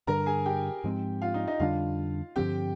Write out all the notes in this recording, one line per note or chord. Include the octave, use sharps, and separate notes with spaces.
G2 D3 G3 D4 A#4 A#5
G#4 G#5
G4 G5
G#2 F3 G#3 C4
F4 F5
D#4 D#5
D#4 D#5
F2 D3 G3 D4 F4 F5
G2 D3 F3 C4 G4 G5